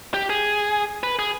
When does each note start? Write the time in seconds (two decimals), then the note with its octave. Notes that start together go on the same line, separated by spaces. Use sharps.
0.14 G4
0.30 G#4
1.03 B4
1.19 G#4